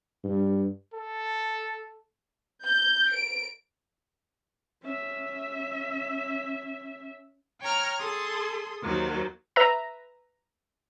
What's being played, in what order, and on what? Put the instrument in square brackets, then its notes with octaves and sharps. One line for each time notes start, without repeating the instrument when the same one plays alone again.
[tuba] G2
[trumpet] A4
[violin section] G6
D7
[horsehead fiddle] C#4 E5
[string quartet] C#5 G5 A#5 F6
G#4 A4 C6 D#6
D#2 D#3 F#3 C5
[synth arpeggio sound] B4 E5 A#5